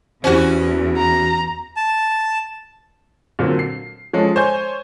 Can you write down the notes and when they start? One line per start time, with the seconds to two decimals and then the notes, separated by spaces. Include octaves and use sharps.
0.24 E2 C#4 E4 F#4 G4 C5
0.97 A#5
1.77 A5
3.39 A#2 D3 F#3 C4
3.59 C7
4.13 F3 G#3 C#4 A4
4.36 C5 C#5 G#5 G6